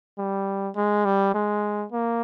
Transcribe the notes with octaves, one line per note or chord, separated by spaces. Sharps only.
G3
G#3
G3
G#3
A#3